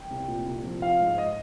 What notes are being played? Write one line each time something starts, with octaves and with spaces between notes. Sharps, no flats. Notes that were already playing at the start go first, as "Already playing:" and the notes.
Already playing: G5
C2
A#2
C2
F3
F4 F5
G#2
D#5